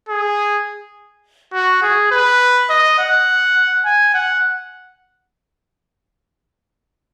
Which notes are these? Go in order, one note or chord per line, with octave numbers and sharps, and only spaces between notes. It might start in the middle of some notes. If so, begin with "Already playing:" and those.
G#4
F#4
G#4
B4
D#5
F#5
G#5
F#5